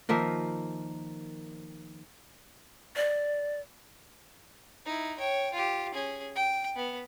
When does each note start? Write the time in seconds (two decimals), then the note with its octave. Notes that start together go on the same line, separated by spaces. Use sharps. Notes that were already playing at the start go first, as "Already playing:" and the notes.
0.09 D#3 F3 A#3 E5
2.96 D5
4.85 D#4 E4
5.18 C#5 G5
5.53 F4 G4
5.94 C#4 G#4
6.35 G5
6.76 B3